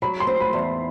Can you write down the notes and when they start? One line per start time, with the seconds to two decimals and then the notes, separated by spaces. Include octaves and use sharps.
0.02 F#3 B5
0.20 C6
0.27 C4
0.40 B5
0.53 E2